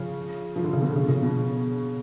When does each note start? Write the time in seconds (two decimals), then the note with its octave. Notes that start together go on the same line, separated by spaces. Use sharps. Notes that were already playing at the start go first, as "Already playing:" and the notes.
Already playing: C#3 F3
0.56 F3
0.64 D3
0.73 C#3
0.81 B2 D3
0.96 C#3
1.09 C#3
1.22 B2